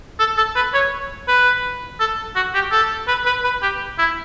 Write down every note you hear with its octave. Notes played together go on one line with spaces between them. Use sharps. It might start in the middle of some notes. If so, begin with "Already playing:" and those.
A4
A4
B4
C#5
B4
A4
F#4
G4
A4
B4
B4
B4
G4
E4